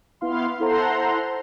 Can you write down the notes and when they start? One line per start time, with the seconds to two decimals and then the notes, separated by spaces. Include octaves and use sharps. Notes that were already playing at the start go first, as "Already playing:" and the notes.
0.21 B3 E4 F5 C6
0.60 E4 A4 C5 F#5 A#5 C6